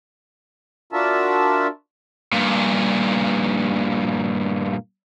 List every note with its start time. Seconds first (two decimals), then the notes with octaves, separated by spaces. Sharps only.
0.93 D4 F4 F#4 A#4 E5 A5
2.32 G2 A#2